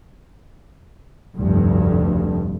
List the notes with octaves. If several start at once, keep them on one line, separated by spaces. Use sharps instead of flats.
F1 D2 G2